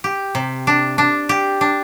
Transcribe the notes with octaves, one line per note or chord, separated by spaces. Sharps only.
G4
C3
D4
D4
G4
D4